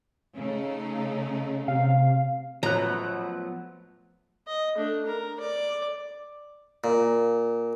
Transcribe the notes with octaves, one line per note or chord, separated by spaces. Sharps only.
C#3 A3 D#4
C3 F5
A1 F3 F#3 A3 B3 A#5 F#6
D#5
A3 D4
A#4
D5
A#2